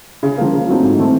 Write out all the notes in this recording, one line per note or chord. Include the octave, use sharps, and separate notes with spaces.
C#3
F3 A#3
C#3
F#3 A3 C4 D#4
G#2
E3 A3 C4